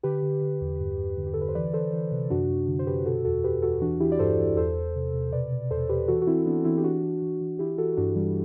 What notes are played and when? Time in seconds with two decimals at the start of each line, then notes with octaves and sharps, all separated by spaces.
0.03 D3 G4 B4
0.22 D3
0.41 D3
0.61 E2
0.80 G2
0.98 G2
1.18 D3
1.26 G4
1.34 D3 A4
1.42 B4
1.49 C5
1.55 E3 B4 D5
1.73 E3 A4 C5
1.93 E3
2.12 C3
2.30 F#2 D4 F#4
2.49 F#2
2.68 D3
2.79 C5
2.87 F#2 G4 B4
3.06 B2 F#4 A4
3.25 E2 F#4 A4
3.44 E2 G4 B4
3.62 E2 F#4 A4
3.82 E3 D4 F#4
4.00 E3 E4 G4
4.12 D5
4.19 G2 A4 C5
4.39 E3
4.57 E2 A4 C5
4.76 E2
4.95 C3
5.14 C3
5.32 B2 B4 D5
5.52 B2
5.71 E2 A4 C5
5.89 E2 G4 B4
6.08 E3 F#4 A4
6.22 F#4
6.27 E3 C4 E4
6.46 E3 B3 D4
6.64 E3 C4 E4
6.78 G4
6.84 E3 D4 F#4
7.03 E3
7.22 E3
7.41 E3
7.59 E3 E4 G4
7.78 E3 F#4 A4
7.97 G2 D4 F#4
8.16 E3 G3